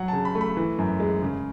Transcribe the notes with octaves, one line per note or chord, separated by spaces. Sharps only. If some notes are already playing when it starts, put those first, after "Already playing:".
Already playing: F#3 F#5
C#3 A5
B5
A3
B5
E3
F#2
G#3
C#3